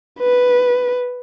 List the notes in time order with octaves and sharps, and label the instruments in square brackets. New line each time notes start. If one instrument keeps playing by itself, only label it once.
[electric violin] B4